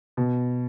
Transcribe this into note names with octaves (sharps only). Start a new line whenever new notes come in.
B2